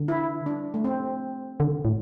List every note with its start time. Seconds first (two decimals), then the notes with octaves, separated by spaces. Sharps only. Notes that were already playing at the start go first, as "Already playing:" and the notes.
Already playing: D3
0.08 E4
0.46 D4
0.74 A3
0.84 C4
1.60 D3
1.85 A2